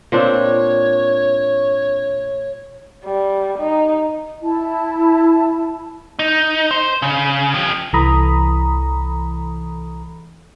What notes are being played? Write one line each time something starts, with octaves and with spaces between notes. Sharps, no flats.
A#2 C4 D4 C#5
G3
D#4
E4 A5
D#4
C5
C#3
F3 G4
C2 E3 A4 A#5 B5 D#6